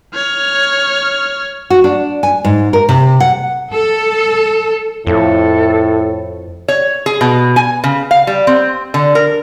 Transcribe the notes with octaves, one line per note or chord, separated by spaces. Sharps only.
C#5 F6
F#4
D4
G#5
G#2
A#4
C3
F#5
A4
F2 A2 A4
C#5
G#4
B2
G#5
C#3
F5
G3
C4
D3
A#4